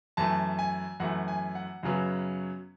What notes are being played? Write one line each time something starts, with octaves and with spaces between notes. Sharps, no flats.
F#2 E3 A3 A5
G#5
F#2 E3 A3 F#5
G#5
F#5
F#2 C#3 F#3 B3